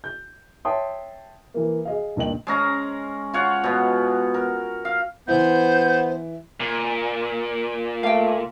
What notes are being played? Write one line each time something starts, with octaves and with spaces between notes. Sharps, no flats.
G6
C#5 E5 G5 A5 C6 D#6
E3 A#3
G#4 D#5 F5
D#1 G2 A#2 D#5 G5 F#7
G#3 C#4 A#5
F4 C#5 F#5
B2 B3
A#4
F5
E3 B3 E4 C5 G6
A#2
A3 F5 G5